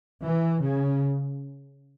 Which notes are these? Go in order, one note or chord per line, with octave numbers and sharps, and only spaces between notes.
E3
C#3